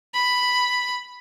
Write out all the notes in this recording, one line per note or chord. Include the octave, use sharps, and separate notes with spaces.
B5